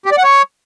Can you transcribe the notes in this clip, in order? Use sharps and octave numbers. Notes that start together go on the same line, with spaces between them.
G4
D5
F#5
C#5